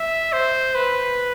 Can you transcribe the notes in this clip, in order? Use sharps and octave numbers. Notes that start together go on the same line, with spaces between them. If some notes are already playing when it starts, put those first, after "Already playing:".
Already playing: E5
C5
B4